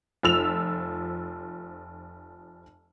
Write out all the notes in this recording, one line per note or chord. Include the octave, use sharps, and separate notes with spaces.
F1 F3 E6 F7